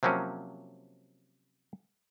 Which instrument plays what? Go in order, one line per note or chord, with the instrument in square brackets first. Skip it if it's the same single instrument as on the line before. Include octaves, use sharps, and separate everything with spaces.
[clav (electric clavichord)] C3 F3 F#3 A#3 C#4